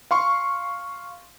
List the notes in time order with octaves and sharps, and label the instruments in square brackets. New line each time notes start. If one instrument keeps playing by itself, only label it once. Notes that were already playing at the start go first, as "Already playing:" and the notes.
[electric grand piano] F5 C6 C#6